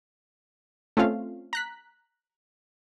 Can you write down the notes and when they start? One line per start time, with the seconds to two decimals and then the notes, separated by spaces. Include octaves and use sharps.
0.97 A3 C4 C#4 F4 F5
1.53 A#5 F#6 B6